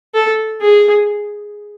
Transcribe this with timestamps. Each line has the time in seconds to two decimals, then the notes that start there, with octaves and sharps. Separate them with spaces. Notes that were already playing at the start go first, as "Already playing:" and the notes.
0.14 A4
0.62 G#4